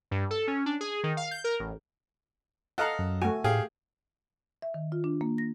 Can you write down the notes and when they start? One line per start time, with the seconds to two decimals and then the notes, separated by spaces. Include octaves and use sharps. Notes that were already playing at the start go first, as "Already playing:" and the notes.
0.11 G2
0.31 A4
0.47 C#4
0.66 D4
0.81 G#4
1.04 D#3
1.17 F5
1.31 G6
1.44 A#4
1.60 A1
2.78 A4 D#5 F5 F#5 A#5
2.99 F#2
3.22 A3 F#4 G#5
3.44 A2 G4 G#4 F5
4.62 E5
4.74 D#3
4.92 F4
5.04 D4
5.21 A#3
5.38 A#6